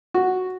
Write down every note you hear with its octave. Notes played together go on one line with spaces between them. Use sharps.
F#4